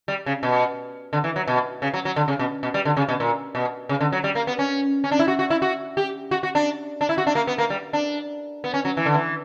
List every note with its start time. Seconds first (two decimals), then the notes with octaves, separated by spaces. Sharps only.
0.08 G3
0.26 C#3
0.43 B2
1.13 D3
1.24 E3
1.36 F#3
1.47 B2
1.82 C#3
1.94 F#3
2.05 F#3
2.16 D3
2.28 C#3
2.39 B2
2.63 B2
2.74 G3
2.85 D3
2.97 C#3
3.09 B2
3.20 A#2
3.55 B2
3.89 C#3
4.01 D3
4.12 F#3
4.24 G3
4.35 A#3
4.47 B3
4.59 C#4
5.04 C#4
5.11 D4
5.19 E4
5.28 F#4
5.39 F#4
5.50 E4
5.62 F#4
5.97 G4
6.31 F#4
6.43 F#4
6.55 D4
7.01 D4
7.09 E4
7.18 F#4
7.27 D4
7.35 A#3
7.47 B3
7.58 A#3
7.70 G3
7.93 D4
8.64 B3
8.74 C#4
8.85 F#3
8.97 E3
9.06 D3
9.15 E3